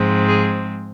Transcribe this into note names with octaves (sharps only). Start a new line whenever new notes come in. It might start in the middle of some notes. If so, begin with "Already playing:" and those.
Already playing: G#2 F3 G#3 C4
G#4